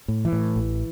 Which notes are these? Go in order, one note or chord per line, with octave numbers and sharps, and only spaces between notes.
A2
E3
A2
A1